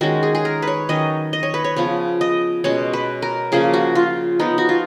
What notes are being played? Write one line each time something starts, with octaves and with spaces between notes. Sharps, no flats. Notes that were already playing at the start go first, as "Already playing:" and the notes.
D#3 G#3 C#4 F#4
G#4
G#4
A#4
B4
C#5
D#3 F#3 C#4 D#5
D#5
C#5
B4
C#5
C#3 F3 B3 C#5
D#5
B2 G#3 C#4 C#5
B4
A#4
C#3 F3 A#3 C#4 G#4
F#4
F4
F3 B3 D#4
F#4
F4